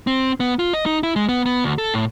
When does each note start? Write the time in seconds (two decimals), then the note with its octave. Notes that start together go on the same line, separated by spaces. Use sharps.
0.07 C4
0.40 B3
0.59 F4
0.74 D#5
0.86 D#4
1.03 E4
1.16 G#3
1.29 B3
1.46 B3
1.64 D2
1.78 A4
1.94 A2